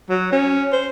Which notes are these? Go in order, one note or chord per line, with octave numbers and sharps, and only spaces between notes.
F#3
C#4
C5